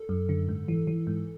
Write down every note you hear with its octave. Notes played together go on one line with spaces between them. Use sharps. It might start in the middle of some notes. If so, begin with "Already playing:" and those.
Already playing: A4
F#2
D3
G#2
E3
E3
G#2